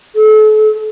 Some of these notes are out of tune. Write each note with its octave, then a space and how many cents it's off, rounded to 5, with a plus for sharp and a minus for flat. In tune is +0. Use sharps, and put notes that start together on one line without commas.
A4 -35